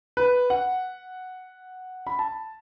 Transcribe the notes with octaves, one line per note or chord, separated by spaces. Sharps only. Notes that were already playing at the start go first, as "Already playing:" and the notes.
B4
F#5
B5
A5